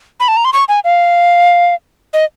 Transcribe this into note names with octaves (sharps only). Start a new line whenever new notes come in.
B5
A5
A#5
C6
C#6
G#5
F5
D#5